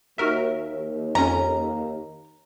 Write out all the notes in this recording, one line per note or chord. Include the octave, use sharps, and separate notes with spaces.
D#2 F#4 A#4 E5
F2 C#4 A#5